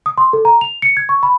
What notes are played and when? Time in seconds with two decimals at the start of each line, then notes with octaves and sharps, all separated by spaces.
0.06 D#6
0.18 C6
0.33 A4
0.45 A#5
0.61 F7
0.82 C#7
0.97 G#6
1.09 C#6
1.23 B5